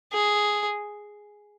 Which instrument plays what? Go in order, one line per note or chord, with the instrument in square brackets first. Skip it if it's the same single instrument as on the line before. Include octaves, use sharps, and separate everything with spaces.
[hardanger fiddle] G#4